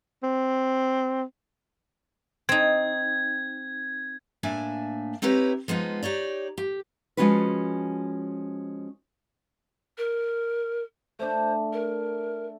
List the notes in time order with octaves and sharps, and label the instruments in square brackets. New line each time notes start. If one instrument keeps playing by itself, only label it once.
[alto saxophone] C4
[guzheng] C4 D#4 [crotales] G#6
[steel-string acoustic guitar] A2 A#3 D4 E5 G#5
C4 D#4 E4 G4 B4 C#5
F3 G#3 B3 D#4 F4
D#4 G4 C#5 D5
G4
[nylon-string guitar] F3 G#3 C#4 F4 F#4 B4
[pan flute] A#4
[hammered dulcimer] A3 D4 [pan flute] C5
[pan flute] A#4